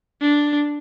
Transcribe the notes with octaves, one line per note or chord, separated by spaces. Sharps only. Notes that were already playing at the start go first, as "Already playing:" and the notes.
D4